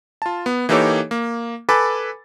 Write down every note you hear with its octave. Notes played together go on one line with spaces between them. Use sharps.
F4 A5
B3
E3 A#3 D#4 G4 A4 C#5
A#3
A4 B4 G#5 B5 D6 A6